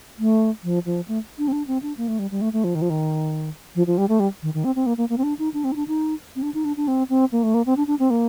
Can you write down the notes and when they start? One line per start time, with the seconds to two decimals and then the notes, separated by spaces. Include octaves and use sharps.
0.19 A3
0.63 F3
0.85 F3
1.08 A3
1.38 D4
1.48 C4
1.52 D4
1.67 C4
1.82 D4
1.97 A#3
2.08 A3
2.19 G3
2.31 G3
2.41 A3
2.53 A3
2.64 F3
2.75 D#3
2.82 F3
2.90 D#3
3.75 F3
3.87 F3
3.98 G3
4.09 A3
4.20 G3
4.43 D#3
4.54 D#3
4.64 C4
4.75 C4
4.86 A#3
4.97 A#3
5.09 A#3
5.18 C4
5.23 D4
5.39 D#4
5.54 D4
5.64 C4
5.72 D#4
5.76 D4
5.88 D#4
6.36 C4
6.42 D4
6.54 D#4
6.65 D4
6.77 D4
6.88 C4
7.09 C4
7.32 A#3
7.43 A3
7.54 A#3
7.66 C4
7.77 D4
7.87 D4
7.99 C4
8.10 A#3